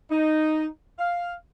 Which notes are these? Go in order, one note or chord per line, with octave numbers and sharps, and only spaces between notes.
D#4
F5